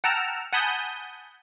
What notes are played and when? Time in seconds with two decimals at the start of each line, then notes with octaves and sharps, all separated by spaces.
0.04 F#5 G5 A5 A#5 E6 F6
0.53 F#5 G#5 A5 B5 D#6 G6